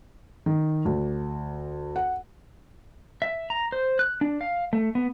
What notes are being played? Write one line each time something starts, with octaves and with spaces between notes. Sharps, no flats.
D#3
D2
F#5
E5
A#5
C5
F#6
D4
F5
A3
B3